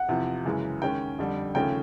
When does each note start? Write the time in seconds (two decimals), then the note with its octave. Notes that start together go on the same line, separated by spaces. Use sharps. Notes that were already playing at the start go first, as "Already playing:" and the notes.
Already playing: F#5
0.09 E2 C3 F3
0.45 F#2 C#3 E3 G#3
0.82 D#2 D#3 G#3 C#4 G5
1.19 F2 D3 G3
1.55 D#2 C#3 F3 A3 C#4 G5